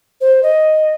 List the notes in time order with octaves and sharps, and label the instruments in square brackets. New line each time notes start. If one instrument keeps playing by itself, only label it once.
[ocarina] C5
D#5